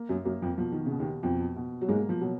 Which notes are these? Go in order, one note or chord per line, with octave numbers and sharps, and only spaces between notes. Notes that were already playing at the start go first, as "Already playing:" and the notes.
Already playing: A#3
F#2 F#3
F#2 F#3 A#3
F2 F3
B2 F3
D#3
C#3
B2
D#2 D#3
F2 B2 F3
B2
F#3
G#2 G#3 A#3
F3
B2 F#3